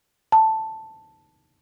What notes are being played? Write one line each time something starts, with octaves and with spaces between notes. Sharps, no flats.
A5